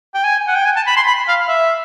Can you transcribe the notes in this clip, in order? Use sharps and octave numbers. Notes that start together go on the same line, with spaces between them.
G5
G#5
F#5
G5
G#5
A5
B5
C6
B5
F5
E5